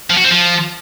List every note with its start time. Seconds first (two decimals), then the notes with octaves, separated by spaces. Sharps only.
0.10 F3
0.18 F#4
0.25 C4
0.32 F3